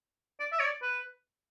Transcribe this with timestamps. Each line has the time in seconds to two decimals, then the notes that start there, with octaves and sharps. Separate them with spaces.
0.40 D5
0.52 E5
0.59 C#5
0.65 D5
0.82 B4